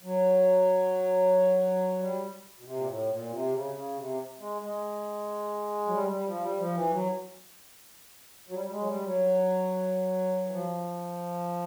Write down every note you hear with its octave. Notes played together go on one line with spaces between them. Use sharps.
F#3
G3
B2
C3
A#2
A2
A#2
C3
C#3
C#3
C3
G#3
G#3
F#3
G3
G3
F3
G3
F3
E3
F#3
F#3
G3
G3
G#3
F#3
G3
F#3
E3
F3